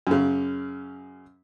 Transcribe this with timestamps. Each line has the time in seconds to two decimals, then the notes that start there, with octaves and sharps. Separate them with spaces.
0.07 F#2 C#3